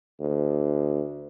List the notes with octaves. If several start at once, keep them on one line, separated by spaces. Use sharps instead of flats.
D2